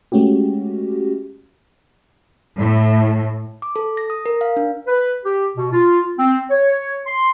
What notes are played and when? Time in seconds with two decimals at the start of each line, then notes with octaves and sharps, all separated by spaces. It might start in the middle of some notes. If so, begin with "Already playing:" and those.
0.12 G#3 A3 C#4 F#4 G4
2.59 A2
3.62 D6
3.76 A4
3.97 A#6
4.10 D#6
4.26 A#4
4.41 F5
4.57 D4
4.87 B4
5.25 G4
5.58 B2
5.72 F4
6.18 C4
6.51 C#5
7.06 C6